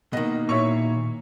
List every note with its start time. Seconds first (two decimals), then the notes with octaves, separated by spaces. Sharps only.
0.13 B2 D#3 A#3 D#5
0.49 A#2 E4 C#5 C#6